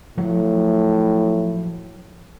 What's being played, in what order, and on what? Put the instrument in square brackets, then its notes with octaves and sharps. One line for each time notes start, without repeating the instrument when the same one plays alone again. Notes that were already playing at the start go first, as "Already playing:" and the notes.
[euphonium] A2 [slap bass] F3 F#3 A3